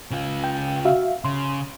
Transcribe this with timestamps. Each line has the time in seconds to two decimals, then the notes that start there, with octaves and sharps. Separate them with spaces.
0.11 C#3 F4
0.44 G5
0.85 F#4 E5 F5
1.24 C#3 C6